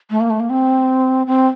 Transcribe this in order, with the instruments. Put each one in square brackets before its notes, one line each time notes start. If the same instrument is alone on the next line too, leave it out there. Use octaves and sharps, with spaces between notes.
[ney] A3
A#3
A3
A#3
C4
C4